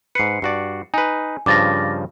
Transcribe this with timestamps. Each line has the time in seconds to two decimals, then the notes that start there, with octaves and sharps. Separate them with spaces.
0.15 G#2 B4 C7 C#7
0.42 G2 F#4 D5
0.94 D#4 B4 G#5
1.46 G2 C#3 F3 D6 A6 A#6